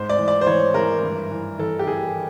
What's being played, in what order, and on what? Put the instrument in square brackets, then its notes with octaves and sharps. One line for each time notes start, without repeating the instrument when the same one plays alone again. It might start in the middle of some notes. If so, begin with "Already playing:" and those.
Already playing: [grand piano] G#2 C5
D5
E3
D5
C5
E3 C#5
E3 A#4
G2
E3
E3 A4
G4
E3 G#4